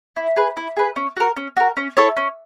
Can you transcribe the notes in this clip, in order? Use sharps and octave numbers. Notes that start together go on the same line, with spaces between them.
E4
G#4 B4
E4
G#4 B4
C#4
F#4 A#4
C#4
F#4 A#4
C#4
E4 A4 C#5
C#4